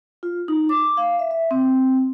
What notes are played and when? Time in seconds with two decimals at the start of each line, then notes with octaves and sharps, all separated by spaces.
0.23 F4
0.48 D#4
0.69 D6
0.97 F5
1.19 E5
1.31 E5
1.51 C4